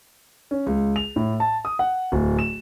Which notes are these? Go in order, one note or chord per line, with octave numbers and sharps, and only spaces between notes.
C#4
C#2
F7
A2
A5
D#6
F#5
D1
E7